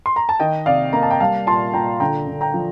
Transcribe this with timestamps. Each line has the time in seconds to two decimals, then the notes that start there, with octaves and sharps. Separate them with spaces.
0.06 C6
0.16 A#5
0.29 A5
0.40 D#3 D#5 G5
0.66 C3 D5 F5
0.93 A#3 A#5
1.03 A5
1.10 G5 A#5
1.20 G3 F5 A5
1.47 A#2 A5 C6
1.73 A#2 G5 A#5
2.00 D3 G5 A#5
2.28 D3
2.41 G5 A#5
2.54 F3